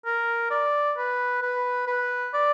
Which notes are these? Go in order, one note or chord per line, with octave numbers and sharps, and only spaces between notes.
A#4
D5
B4
B4
B4
D5